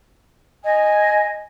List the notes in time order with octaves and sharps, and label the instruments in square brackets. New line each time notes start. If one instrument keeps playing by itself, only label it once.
[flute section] D#5 G#5